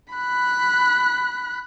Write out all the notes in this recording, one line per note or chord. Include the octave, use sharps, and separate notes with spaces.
B5 F#6